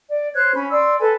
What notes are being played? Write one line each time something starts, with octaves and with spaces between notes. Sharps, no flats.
D5
C5 C#5 F#6 G#6
C#4 B5
D5 C6 E6
A4 B4 G#5